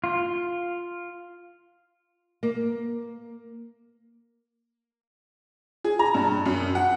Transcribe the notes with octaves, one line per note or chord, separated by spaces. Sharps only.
F4
A#3
G#4
A#5
G2
F#2
F#5